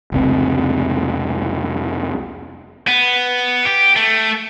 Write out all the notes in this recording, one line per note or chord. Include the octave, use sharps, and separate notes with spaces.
F1 C#2 C4
B3
G4
A3